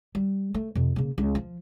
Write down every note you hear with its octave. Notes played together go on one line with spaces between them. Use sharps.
G3
A3
F2 C3
C#3 A#3
C#2
F3